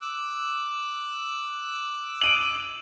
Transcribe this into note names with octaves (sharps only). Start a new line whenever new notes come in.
D6 E6 F#6
D7 D#7 F#7